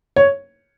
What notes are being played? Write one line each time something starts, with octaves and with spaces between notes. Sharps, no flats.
C#5